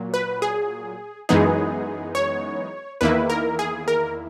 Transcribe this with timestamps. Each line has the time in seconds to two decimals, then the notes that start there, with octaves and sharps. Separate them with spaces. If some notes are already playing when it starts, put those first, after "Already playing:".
Already playing: A#2 F#3
0.14 B4
0.42 G#4
1.29 F#2 E3 G#3 B3 D#4 G#4
2.15 C#5
3.01 E2 D#3 A#3 E4 B4
3.30 A#4
3.59 G#4
3.88 A#4